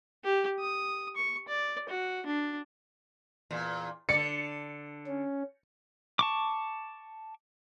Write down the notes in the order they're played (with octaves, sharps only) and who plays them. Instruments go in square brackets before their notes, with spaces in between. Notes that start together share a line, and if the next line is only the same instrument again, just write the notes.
[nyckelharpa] G4
D#6
C#6
D5
F#4
D4
[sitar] E2 A#2
[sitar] D3 D5 [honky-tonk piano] C#7
[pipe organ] C#4
[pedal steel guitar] A5 C#6 D6